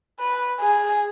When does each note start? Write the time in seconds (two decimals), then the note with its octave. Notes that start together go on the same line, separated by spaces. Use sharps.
0.20 B4
0.60 G#4